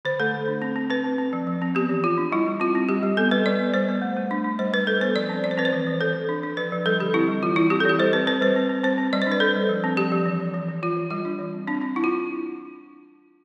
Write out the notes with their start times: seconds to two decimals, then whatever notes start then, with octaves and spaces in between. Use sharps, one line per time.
0.05 D3 C5
0.20 A3 A4
0.33 D3
0.48 D4
0.62 C4
0.76 C4
0.90 C4 B4
1.04 C4
1.18 C4
1.33 F3
1.47 F3
1.62 C4
1.75 B3 G4
1.89 E3
2.04 E3 F4
2.18 D4
2.32 G3 E4
2.47 G3
2.60 C4 F4
2.75 C4
2.89 G3 G4
3.03 G3
3.17 B3 A4
3.31 G3 B4
3.46 G3 D5
3.59 B3
3.74 G3 C5
3.89 B3
4.02 A3
4.17 A3
4.31 D4
4.44 D4
4.59 G3 C5
4.73 G3 B4
4.87 G3 A4
5.01 B3 C5
5.15 F3 D5
5.29 C4
5.44 F3 D5
5.51 C5
5.58 C4 B4
5.65 C5
5.72 E3
5.87 E3
6.01 E3 A4
6.14 E3
6.29 D4
6.43 D4
6.57 F3 B4
6.72 F3
6.86 G3 A4
7.00 D3 G4
7.14 C4 E4
7.28 G3
7.43 E3 F4
7.56 E3 E4
7.70 C4 G4
7.80 A4
7.85 E3 G4
7.99 G3 C5
8.13 C4 B4
8.27 C4 B4
8.41 G3 C5
8.56 C4
8.69 C4
8.84 C4 C5
8.98 C4
9.13 G3 D5
9.22 C5
9.27 D4
9.32 B4
9.40 D4 A4
9.56 G3
9.69 F3
9.84 C4
9.97 F3 G4
10.12 F3
10.26 E3
10.40 E3
10.54 E3
10.68 E3
10.83 E3 F4
10.97 E3
11.10 G3 F4
11.25 D4
11.39 E3
11.54 C4
11.68 C4 D4
11.81 C4
11.96 D4 E4
12.04 F4